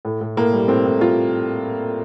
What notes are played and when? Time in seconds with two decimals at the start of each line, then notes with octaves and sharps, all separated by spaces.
0.05 A2
0.21 A2
0.37 A2 A#3
0.53 G3
0.68 A2 C4
0.85 A2
1.01 G3 F4